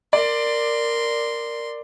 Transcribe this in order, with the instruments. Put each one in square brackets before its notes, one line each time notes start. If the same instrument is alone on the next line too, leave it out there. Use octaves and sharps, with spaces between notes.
[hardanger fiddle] A#4 C6 [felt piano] D5